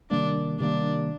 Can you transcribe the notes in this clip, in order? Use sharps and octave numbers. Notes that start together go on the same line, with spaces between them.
C3 D#3 G3 A#3 D4
C3 D#3 G3 A#3 D4